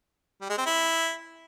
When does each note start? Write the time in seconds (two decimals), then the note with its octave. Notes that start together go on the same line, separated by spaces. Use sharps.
0.41 G3
0.49 G#3
0.58 C4
0.66 E4